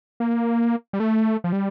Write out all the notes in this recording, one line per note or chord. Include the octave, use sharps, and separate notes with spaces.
A#3
G3
A3
F3
G3